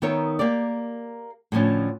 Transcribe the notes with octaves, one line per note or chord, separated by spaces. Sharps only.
D#3 B3 D#4 A#4 C#5 E5
A#3 G4 A#4 D5
A2 D3 F3 C#4